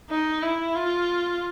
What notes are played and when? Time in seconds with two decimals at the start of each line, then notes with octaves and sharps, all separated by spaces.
0.10 D#4
0.42 E4
0.75 F4